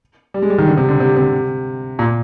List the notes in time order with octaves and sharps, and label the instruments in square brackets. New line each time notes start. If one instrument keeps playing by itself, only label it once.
[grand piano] G3
G#3
G3
D#3
D3
C3
D3
C3
C3
A#2